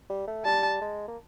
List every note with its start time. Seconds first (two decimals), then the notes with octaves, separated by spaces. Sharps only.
0.10 G3
0.28 A3
0.45 G3 A5
0.82 G#3
1.08 A#3